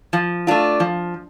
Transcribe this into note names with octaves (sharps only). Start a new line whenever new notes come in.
F3
A3 D4 F4
F3